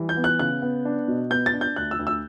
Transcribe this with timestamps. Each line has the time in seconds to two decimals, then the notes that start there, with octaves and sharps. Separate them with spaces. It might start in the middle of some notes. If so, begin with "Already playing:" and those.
Already playing: E3 G3
0.09 G6
0.17 B3
0.24 F#6
0.39 C#3 F#6
0.62 B3
0.85 D4
1.08 B2
1.30 B3 G6
1.46 A6
1.53 D4
1.61 G6
1.76 D2 F#6
1.91 E6
1.99 D2
2.07 E6